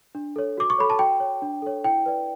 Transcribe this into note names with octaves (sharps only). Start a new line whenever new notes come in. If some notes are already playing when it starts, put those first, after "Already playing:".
D4
A4 C#5
F#4 D6
C#6
A4 C#5 B5
A5
F#4 G5
C#5
D4
A4 C#5
E4 G5
B4 D5